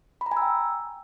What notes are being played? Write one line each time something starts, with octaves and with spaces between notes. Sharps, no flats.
B5
A#5
G#5
E6
G5